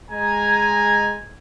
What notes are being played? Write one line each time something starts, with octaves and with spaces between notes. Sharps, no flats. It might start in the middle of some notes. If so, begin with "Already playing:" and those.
G#3 G#5 A#5